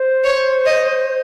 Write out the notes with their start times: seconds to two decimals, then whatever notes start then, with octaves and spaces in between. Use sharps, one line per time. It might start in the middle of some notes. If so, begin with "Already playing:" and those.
Already playing: C5
0.24 C#5
0.66 D#5